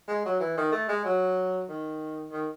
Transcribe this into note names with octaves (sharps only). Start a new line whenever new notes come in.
G#3
F#3
E3
D#3
A3
G#3
F#3
D#3
D#3